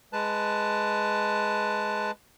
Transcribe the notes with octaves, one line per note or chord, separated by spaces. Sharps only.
G#3 B4 A5